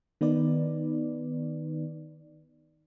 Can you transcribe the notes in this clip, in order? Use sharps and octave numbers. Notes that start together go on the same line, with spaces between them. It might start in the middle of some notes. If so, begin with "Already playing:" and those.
D#3 B3 D#4 B4 D5